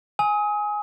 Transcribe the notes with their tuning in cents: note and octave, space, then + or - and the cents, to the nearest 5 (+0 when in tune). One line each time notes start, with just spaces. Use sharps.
G#5 +0 D#6 +35